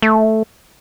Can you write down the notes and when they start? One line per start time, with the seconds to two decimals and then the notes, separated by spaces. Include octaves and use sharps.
0.02 A3